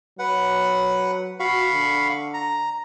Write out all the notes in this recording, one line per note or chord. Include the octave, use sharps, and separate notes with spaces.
F#3 B4 F#5
F#4 F5 B5 C#6
D3
A#5